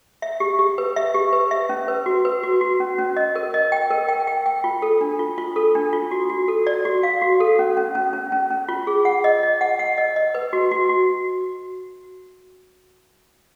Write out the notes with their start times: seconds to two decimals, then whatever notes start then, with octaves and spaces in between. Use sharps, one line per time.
0.22 E5
0.40 G4
0.59 G4
0.78 B4
0.96 E5
1.14 G4
1.33 B4
1.51 E5
1.69 C#4
1.88 B4
2.06 F#4
2.25 B4
2.43 F#4
2.61 F#4
2.80 C#4
2.98 C#4
3.16 D#5
3.35 A#4
3.54 D#5
3.72 G5
3.90 A#4
4.08 G5
4.27 G5
4.46 G5
4.64 F4
4.82 A4
5.01 D4
5.19 F4
5.38 F4
5.56 A4
5.75 D4
5.93 F4
6.11 F#4
6.30 F#4
6.48 A4
6.67 D5
6.85 F#4
7.03 F5
7.22 F#4
7.40 A4
7.59 C#4
7.77 C#4
7.95 C#4
8.13 C#4
8.32 C#4
8.50 C#4
8.68 F4
8.87 G#4
9.05 F#5
9.24 D#5
9.43 D#5
9.61 F#5
9.79 F#5
9.98 D#5
10.16 D#5
10.34 B4
10.53 F#4
10.71 F#4
10.90 F#4